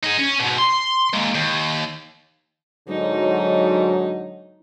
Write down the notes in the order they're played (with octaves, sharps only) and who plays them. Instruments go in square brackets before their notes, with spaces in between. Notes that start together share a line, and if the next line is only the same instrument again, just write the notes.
[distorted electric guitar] D#4 G#4
C#4
G#2 B2
C6
G#3 A#3
D#2
[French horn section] G#2 D3 F#3 [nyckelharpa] D#4